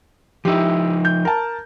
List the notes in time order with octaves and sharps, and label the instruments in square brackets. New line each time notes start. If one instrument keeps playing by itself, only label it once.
[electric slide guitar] F3 D#4 [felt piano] E4 G4
[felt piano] G6
A#4 A5